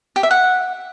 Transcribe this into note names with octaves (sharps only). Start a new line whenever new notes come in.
G4
E5
F#5